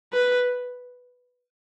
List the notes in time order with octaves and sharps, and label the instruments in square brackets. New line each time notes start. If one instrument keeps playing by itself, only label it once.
[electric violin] B4